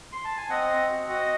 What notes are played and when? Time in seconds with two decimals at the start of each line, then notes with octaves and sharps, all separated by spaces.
0.12 C6
0.24 A5
0.37 G#5
0.50 C4 D#5 F#5
0.70 C4
0.89 F#4
1.09 F#4 D#5 F#5